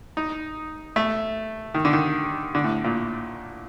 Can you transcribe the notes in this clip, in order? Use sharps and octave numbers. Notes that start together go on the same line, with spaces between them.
D#4
A3
D#3
D3
D#3
D3
A2
A#2